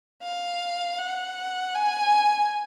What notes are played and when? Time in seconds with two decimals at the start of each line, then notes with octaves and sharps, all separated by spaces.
0.23 F5
0.99 F#5
1.75 G#5